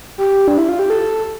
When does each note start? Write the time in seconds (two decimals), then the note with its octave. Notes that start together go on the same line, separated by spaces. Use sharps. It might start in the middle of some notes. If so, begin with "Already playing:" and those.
0.18 G4
0.48 D4
0.58 E4
0.69 F4
0.79 G4
0.90 A4